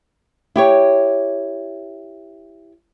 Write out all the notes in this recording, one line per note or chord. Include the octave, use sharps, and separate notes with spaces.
E4 G4 C#5